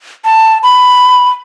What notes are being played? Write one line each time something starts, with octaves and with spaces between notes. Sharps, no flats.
A5
B5